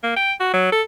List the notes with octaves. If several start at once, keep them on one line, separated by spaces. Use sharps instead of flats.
A#3
G5
F#4
F#3
A4